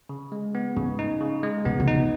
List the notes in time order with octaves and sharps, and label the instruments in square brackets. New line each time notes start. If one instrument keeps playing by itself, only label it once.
[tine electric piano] C#3
G#3
B3
[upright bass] G#2 [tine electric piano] C#3
[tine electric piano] D#4
C#3
G#3
[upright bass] B2 [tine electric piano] B3
[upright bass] C#3
[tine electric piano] D#4
[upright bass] B2